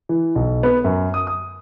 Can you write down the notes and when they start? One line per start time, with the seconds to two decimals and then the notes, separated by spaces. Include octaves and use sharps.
0.09 E3
0.35 B1
0.63 B3
0.84 F#2
1.14 D#6
1.27 D#6